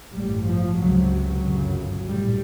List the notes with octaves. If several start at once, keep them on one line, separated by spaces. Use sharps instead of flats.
A1 G2 G3
F3
C#2 C3 F#3
G1 F#2 C#3
A#1 A2 G3